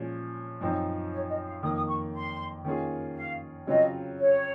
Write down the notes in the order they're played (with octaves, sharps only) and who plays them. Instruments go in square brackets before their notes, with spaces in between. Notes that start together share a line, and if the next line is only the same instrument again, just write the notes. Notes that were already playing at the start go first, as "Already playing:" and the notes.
Already playing: [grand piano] A#2 F3 G#3 C#4
[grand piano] F#2 F3 C4 D#4 [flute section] D#5
[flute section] C#5
D#5
F5
[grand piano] F2 D#3 A#3 [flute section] D#6
[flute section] D#6
C#6
C6
[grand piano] D#3 A#3 C#4 F4 G#4
[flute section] F5
[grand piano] C#3 F#3 C4 F4 [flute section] D#5
[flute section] C#5